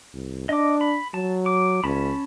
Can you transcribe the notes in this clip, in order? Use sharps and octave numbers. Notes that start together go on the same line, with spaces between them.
C2
D4 D#5 D6
B5
F#3 A5
D6
C#2 C#4 A5 B5